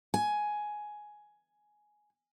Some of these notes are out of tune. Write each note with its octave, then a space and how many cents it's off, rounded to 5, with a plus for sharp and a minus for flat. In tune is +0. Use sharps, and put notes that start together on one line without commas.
G#5 +10